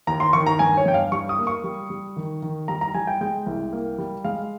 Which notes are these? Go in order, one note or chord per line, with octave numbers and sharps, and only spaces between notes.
D#2 A#5
C6
D#3 C#6
A#5
G2 G#5
C#5
G2 G5
F5
G3 C#6
D#6
A#3
C#6
G3
G3
D#3
D#3
G3 A#5
A#5
G3 G#5
G5
G#3 G5
C2
A#3
G3
G#3 F5